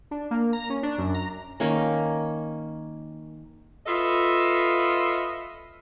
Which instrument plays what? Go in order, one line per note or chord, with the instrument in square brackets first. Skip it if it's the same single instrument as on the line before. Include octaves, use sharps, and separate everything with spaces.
[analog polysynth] D4
A#3
A#5
C#4
D4
F#2
A#5
[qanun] D#3 A#3 C#4
[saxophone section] F4 A4 B4 D#5 E5